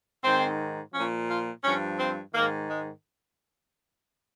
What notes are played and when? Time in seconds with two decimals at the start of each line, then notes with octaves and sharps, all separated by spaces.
0.24 G#2 D#3 C4
0.94 A#2 F3 C#4
1.29 F4
1.64 G2 F3 C#4
1.99 C4
2.34 G#2 D#3 A#3
2.69 G#3